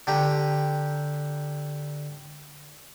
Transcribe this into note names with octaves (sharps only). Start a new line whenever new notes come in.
D3 G4 A#5